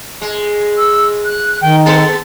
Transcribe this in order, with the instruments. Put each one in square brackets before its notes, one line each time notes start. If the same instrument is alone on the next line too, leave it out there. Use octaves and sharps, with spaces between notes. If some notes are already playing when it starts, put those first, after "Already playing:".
[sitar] G#3
[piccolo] E6
F#6
[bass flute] D#3 [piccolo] G5
[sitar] B3 G#4 A4 [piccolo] A6